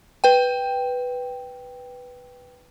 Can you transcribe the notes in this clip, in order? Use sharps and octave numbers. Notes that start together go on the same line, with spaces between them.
B4 G5